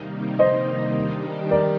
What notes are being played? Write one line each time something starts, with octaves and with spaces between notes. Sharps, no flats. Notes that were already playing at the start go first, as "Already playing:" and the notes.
Already playing: C3 D#3 G3 A#3 D#4
C5 D#5
D#3 G3 D4 G4
A#4 D5